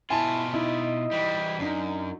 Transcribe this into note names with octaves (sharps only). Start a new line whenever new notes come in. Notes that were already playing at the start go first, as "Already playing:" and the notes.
B2 E4 F4 G#5 A5
D#4 E4 D#5
E3 G3
F#2 D4 D#4